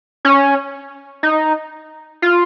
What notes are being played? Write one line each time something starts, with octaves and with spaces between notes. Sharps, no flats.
C#4
D#4
F4